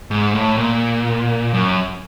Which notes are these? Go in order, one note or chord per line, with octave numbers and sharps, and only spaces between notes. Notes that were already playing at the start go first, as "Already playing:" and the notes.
G#2
A2
A#2
F#2